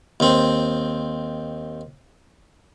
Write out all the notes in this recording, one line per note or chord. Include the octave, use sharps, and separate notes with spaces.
D#2 C4